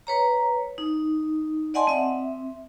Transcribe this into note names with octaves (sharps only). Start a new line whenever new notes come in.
B4 C#5 A#5
D#4
D5 D#5 F#5 G#5 A5 C6
C4 E5